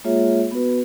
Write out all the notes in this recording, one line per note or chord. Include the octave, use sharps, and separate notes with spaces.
G#3 A#3 F4 G#4 C#5 E5
B3 F#4 B4